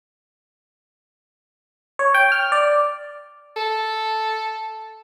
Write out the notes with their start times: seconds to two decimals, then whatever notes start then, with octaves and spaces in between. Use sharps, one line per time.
1.99 C#5
2.14 G5
2.32 F6
2.52 D5
3.56 A4